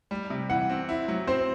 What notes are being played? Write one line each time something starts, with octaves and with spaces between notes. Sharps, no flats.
G3
C3
E3 F#5
C4
E4
F#3
C4 C5